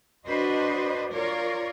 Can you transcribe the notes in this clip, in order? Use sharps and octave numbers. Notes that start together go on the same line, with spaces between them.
D4 F#4 B4 C5 D#5
F4 A#4 C#5 D5